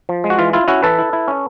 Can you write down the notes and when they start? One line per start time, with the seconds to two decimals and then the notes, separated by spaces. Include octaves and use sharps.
0.09 F3
0.24 G#3
0.30 F#4
0.39 E3 F4
0.53 E4 F4
0.68 C#4 E4 F#4
0.83 E3 A4 B4
0.99 E4
1.13 E4
1.28 C#4